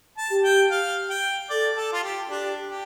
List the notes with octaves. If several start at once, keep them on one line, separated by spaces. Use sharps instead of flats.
A5
G4
G5
F5
G5
A4 D5
A4
F4
G4
D4 G4
G4